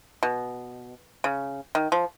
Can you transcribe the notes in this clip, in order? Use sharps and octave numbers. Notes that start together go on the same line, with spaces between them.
B2
C#3
D#3
F3